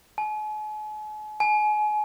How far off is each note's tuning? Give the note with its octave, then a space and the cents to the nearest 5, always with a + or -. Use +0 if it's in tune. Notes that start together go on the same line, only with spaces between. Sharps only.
G#5 +45
G#5 +30